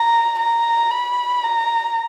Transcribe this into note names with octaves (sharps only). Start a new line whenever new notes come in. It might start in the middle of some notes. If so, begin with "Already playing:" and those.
Already playing: A#5
A#5
B5
A#5